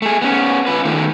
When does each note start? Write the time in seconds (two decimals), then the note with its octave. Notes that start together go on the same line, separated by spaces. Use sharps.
0.02 A3 G#4
0.22 B3 C#4
0.67 F4 B4
0.85 D#3 A3